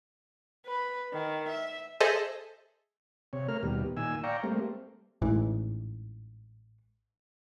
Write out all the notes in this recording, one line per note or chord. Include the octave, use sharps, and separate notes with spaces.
B4
D#3
E5
G#4 A4 C5 D#5 E5
C3 C#5
A3 A#4 F6
D#2 B2 G3
A#2 D#3 G#5 E6
D5 F5 G5 A#5 C#6
G3 A3 A#3 C4
A1 G#2 E3